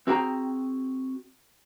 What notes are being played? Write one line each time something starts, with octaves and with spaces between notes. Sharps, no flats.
C4 F#4 G#4 G5 G#5 A#5